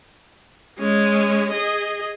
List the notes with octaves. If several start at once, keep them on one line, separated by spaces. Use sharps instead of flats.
G#3 C#4
G#4 D#5